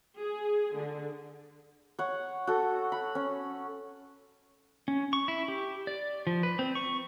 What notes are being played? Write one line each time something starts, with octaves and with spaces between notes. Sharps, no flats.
G#4
D3
C#5 F#5
F#4 A4
B5
C#4
C#4
C#6
E4
G4
D5
F3
B4
C4
C#6